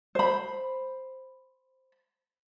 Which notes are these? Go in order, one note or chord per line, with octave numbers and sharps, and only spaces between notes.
C5 B5